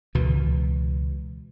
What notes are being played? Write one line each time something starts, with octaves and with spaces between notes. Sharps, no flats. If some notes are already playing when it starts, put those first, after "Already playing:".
C#2 B2 E3